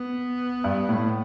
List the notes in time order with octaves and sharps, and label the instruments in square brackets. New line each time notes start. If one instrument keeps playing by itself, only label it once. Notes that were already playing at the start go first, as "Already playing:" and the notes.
Already playing: [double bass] B3
[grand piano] G2
A2